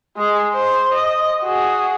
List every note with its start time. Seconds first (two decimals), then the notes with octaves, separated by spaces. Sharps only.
0.17 G#3 G#4
0.53 C5
0.93 D#5
1.42 F#4 G#4